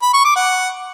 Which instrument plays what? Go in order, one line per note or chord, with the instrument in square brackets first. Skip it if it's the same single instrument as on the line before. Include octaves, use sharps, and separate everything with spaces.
[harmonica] B5
C#6
D6
F#5